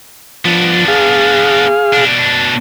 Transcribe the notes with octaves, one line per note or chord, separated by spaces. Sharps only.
F3 B3 D4
G#4 F5
B2 D4